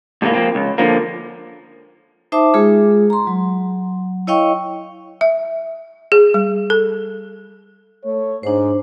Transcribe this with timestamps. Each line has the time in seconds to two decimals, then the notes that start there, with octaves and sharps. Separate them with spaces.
0.22 G#2 C3 E3 A#3
0.34 F3 A#3 C4
0.55 C#2
0.78 D3 F3 A#3
2.32 D#4 C5 E5 A5 D6 D#6
2.54 G#3 F4 G#4
3.10 A#5 C6
3.27 F#3
4.27 E4 C#5 D#5 F5 G5 C#6
5.21 E5
6.12 G#4
6.34 G3
6.70 A4
8.05 A3 C#5
8.43 G#2 D4 C5